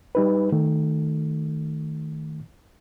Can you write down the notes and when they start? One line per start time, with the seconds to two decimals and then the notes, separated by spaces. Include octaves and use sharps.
0.15 G3 D#4 B4
0.52 D#3 A3